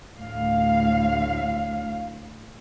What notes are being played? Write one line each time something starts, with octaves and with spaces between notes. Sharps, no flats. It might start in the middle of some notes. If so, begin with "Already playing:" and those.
D2 A2 F5